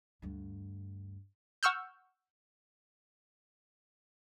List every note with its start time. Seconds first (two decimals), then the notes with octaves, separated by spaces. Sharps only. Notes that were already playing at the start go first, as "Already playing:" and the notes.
0.22 D2 G2
1.63 F#5 C#6 E6 F6 G6